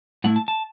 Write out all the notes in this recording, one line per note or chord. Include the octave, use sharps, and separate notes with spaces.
A2 A3 E4 F#5
A5
A5